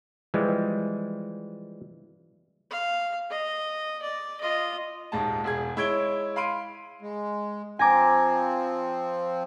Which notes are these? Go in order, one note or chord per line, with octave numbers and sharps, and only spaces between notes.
E3 F3 G3 G#3
F5
D#5
D5
F4 D#5
D#1 G#2 A5
E1 G#4 G#6
G#3 E4 C#5 G#6 D7 G7
F5 B5 C6 D7 D#7
G#3
F3 C4 G#5 A#5 D6